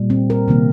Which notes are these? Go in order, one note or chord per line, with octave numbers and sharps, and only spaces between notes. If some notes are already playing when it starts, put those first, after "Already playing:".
Already playing: A#2 G3
C4
A#4
C3 D#3 A#3